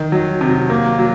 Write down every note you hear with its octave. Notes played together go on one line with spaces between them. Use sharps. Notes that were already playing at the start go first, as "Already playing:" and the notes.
Already playing: D#3
F#3
C3
A#3
F#3